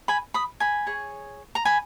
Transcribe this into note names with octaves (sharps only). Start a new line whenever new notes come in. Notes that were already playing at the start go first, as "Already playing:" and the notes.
G#5 B5
B5 D#6
G#5 B5
G#4 C#5
A#5
G#5 B5